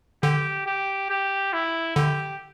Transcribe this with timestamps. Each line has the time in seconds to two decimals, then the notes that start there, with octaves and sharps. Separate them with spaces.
0.23 D3 G4
0.66 G4
1.10 G4
1.53 E4
1.96 D3 G4